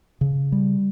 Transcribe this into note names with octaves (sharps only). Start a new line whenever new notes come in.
C#3
G3